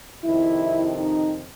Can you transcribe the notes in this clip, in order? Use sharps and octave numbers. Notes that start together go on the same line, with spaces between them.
F2 C3 D#3 E4
D#4